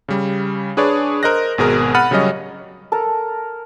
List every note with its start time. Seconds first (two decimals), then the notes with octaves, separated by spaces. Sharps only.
0.08 C#3 G3
0.77 D4 G#4 B4 C#5 D5
1.23 A#4 C5 D#5 F#6 A#6
1.58 G#1 B2 G#4 A#4
1.95 F#5 B5 F6 A6 D#7
2.11 C#3 F#3 G3 C#4 D#5
2.92 A4 A#4 A5 A#5